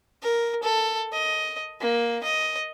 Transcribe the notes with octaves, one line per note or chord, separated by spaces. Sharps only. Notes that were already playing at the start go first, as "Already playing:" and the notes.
A#4
A4
D#5
A#3
D#5